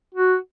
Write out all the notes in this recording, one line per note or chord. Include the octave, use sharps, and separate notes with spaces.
F#4